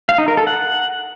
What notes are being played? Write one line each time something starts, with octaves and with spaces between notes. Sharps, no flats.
F5
D#4
A#4
A4
F#5